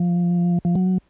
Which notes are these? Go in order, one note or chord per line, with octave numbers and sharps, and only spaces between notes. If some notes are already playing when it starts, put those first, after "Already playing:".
Already playing: F3
F3
F#3